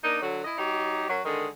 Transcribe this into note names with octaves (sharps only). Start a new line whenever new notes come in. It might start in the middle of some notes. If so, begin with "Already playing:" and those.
A#3 D4 D#4
D3 F#3
E4 D#5
F#3 D#4 G4
F#2 F#3
D3 D#3 G#3